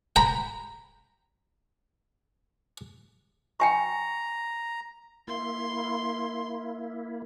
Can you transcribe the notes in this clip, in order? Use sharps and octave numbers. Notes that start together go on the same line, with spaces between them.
G5 A#5 B5
G5 G#5 A#5 C#6
A#3 E4 C6